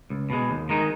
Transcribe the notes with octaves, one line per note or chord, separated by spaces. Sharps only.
C#2
B2 G#3
D#2
D#3 G#3 D#4